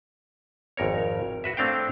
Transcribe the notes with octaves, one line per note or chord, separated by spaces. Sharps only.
G#1 F2 A#4 C#5
F#4 B4 E5
A3 C4 D4 F5 G5